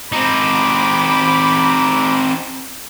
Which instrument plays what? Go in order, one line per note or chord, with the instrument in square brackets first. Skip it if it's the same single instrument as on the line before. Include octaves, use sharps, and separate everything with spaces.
[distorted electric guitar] C4 D#4 [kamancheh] B5 D6